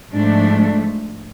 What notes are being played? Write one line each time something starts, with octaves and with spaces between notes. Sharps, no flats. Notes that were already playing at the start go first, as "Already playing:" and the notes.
G#2 F3 A3 D4